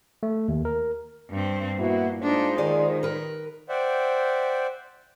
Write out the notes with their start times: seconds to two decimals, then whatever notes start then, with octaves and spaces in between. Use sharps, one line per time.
0.23 A3
0.48 D#2
0.65 A#4
1.30 G2 C4
1.78 A#2 B3 E4 F#4
2.22 G#3 D4 D#4 F4 C5
2.58 D#3 G#4 D5
3.03 A#4 B4
3.69 C5 D5 E5 F#5 G5